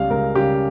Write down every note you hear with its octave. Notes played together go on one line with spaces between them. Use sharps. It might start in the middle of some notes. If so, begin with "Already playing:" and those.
Already playing: C#2 C#3 G3 F5
C#2 A#4
C#3 G3 G4